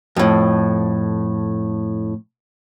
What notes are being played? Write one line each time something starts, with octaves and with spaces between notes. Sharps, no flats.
F2 A2